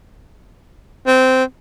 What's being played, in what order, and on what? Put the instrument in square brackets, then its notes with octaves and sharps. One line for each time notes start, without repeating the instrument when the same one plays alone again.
[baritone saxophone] C4